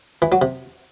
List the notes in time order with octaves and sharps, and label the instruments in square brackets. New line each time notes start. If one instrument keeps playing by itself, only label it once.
[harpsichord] E3
F#3
C3